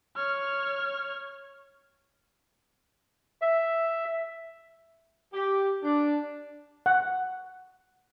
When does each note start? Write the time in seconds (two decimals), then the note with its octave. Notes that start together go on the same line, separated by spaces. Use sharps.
0.16 C#5 F6
3.42 E5
5.34 G4
5.83 D4
6.86 F#5